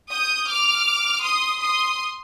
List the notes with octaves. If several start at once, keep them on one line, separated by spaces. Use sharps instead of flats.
D#6 G6
D6 F6
C6 D#6
C6 D#6